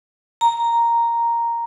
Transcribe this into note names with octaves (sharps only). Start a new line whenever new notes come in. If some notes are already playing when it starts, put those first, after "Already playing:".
A#5